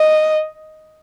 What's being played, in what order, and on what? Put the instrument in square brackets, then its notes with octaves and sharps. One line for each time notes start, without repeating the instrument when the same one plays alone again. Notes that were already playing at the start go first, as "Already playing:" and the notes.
Already playing: [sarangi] D#5